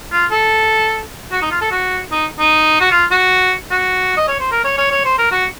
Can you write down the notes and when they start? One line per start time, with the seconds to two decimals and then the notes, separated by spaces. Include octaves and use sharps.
0.12 F4
0.31 A4
1.31 F#4
1.42 D#4
1.51 F4
1.61 A4
1.71 F#4
2.12 D#4
2.39 D#4
2.80 F#4
2.91 F4
3.11 F#4
3.71 F#4
4.17 D#5
4.28 C#5
4.40 C5
4.51 A#4
4.64 C#5
4.78 C#5
4.91 C#5
5.05 C5
5.18 A#4
5.31 F#4